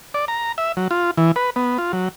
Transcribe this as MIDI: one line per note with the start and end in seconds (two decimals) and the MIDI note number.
0.14 0.25 74
0.28 0.52 82
0.58 0.72 76
0.77 0.88 54
0.91 1.11 65
1.18 1.32 52
1.36 1.50 71
1.56 1.78 59
1.78 1.92 65
1.93 2.09 54